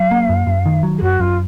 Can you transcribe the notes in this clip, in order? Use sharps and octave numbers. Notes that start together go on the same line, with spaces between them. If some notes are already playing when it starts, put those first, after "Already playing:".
Already playing: F#3 F5
A#3
F#2
F#2
D#3
F#3
G#4
F#2 F#4
F#2 F4